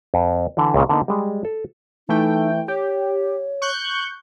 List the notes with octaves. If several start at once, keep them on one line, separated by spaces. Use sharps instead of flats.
F2
D3 E3
C#2 A#2 C#3
D3 A#3 B3 D#4
G3 G#3
A4
E3 A3 D#4 G5
G4 C#5
C#6 F#6 G6